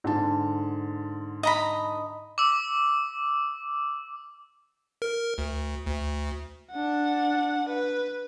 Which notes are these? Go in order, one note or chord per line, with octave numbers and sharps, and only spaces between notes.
G#2 D3 A5
D#5 A#5 B5
D6 E6
A#4
D2
D2
D4 F#5
B4